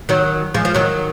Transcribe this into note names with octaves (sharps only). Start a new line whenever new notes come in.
D#3 F#3
F3 G#3
F3
D#3 F#3